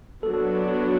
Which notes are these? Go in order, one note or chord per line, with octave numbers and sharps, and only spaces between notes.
F#3 B3 D4 F#4 A4
A4